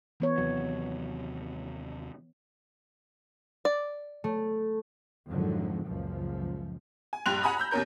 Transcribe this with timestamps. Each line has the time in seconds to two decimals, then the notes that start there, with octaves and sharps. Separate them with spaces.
0.20 E3 B3 C#5
0.38 D#2 C3 F#3
3.65 D5
4.24 A3
5.28 F2 G#2 D3 D#3 F3 F#3
5.86 C#2 F#2 A#2 F3
7.13 G#5
7.26 A#1 G2 G5 C6 F#6 F7
7.43 F#5 G#5 A#5 B5 D#6
7.57 A#5 B5 E6 G6
7.71 D#2 B2 C#4 A#4 G6